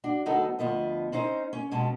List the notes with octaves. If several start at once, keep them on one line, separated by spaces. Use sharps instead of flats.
D4 F#4
D2 F#3 B3 D#4 F#4 A4
D2 F3 B3 D#5
C4 C#4 D#4 C5
C#4
F2 B2 G#3 C#4 A5